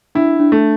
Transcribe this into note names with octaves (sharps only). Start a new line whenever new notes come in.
D4 E4
D4
A3